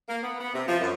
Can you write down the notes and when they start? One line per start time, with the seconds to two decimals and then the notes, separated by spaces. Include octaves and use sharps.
0.09 A#3
0.22 B3
0.40 B3
0.54 C3
0.68 F3
0.81 F#2